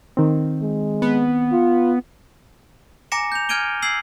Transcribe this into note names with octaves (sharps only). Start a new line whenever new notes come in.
D#3 C4
G#3
B3
F4
G#5 A#5 D6 A#6 C#7 E7
G6 F7
G#5 F6 G#6 D7 D#7 G7
E6 G#6 C7 F#7